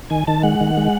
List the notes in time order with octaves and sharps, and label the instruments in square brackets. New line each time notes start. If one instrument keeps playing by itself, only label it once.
[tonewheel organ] D#3 G#5
D#3 A5
G#3 F#5
D#3
G#3